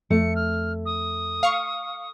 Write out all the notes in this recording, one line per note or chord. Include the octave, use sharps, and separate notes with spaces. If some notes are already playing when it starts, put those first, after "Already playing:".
F2 A3 C#7
F6
D#6
F5 C#6